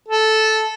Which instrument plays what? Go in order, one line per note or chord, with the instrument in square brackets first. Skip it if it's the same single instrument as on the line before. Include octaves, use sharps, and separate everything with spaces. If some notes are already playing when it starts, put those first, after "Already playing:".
[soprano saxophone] A4